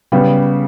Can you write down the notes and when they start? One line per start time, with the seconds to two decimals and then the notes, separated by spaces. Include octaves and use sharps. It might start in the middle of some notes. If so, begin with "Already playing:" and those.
0.12 C#3 G3 B3